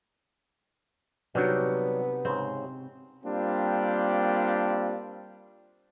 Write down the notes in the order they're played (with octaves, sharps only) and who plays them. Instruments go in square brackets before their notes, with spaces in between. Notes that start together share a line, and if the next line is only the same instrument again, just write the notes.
[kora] C3 D4 D#4 [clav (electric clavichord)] F#3 G3 [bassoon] B3
[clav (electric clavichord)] G#2 C#3 [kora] C4
[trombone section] G3 A#3 C4 D4 F4